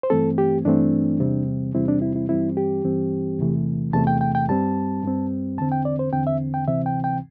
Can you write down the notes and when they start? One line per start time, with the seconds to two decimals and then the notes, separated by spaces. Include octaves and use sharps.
0.03 C5
0.10 G2 E3 A3 C4 A4
0.38 G4
0.65 G2 E3 A3 C4 D4
1.20 E2 C3 G3 C4
1.74 E2 C3 G3 C4 E4
1.88 D4
2.02 E4
2.16 E4
2.29 G2 E3 G3 C4 E4
2.57 G4
2.84 G2 E3 G3 C4
3.39 E2 C3 E3 A3
3.93 E2 C3 E3 A3 A5
4.07 G5
4.21 G5
4.35 G5
4.48 G2 G3 C4 A5
5.03 G2 G3 C4
5.58 E2 D3 C4 A5
5.72 G5
5.85 D5
5.99 C5
6.13 E2 D3 C4 G5
6.27 E5
6.54 G5
6.68 D2 C3 E3 C4 E5
6.86 G5
7.04 G5